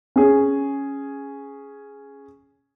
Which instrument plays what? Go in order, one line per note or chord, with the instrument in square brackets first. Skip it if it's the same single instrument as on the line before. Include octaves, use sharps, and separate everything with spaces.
[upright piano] C#4 G#4